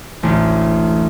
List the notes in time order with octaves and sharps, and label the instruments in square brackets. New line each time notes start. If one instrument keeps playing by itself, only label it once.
[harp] A1 D2